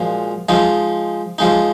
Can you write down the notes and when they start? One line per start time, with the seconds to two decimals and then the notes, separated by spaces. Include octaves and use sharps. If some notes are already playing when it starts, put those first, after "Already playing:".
Already playing: A#2 F3 G#3 F#4
0.49 F3 G#3 D#4
1.38 F3 G#3 D#4